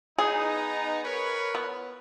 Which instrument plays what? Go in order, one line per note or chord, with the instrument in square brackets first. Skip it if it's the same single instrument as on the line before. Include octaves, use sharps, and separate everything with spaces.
[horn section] B3 D#4 [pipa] G#4
[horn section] A#4 B4 C#5
[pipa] B3